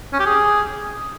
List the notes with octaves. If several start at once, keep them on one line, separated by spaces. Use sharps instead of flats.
C#4
G4
G#4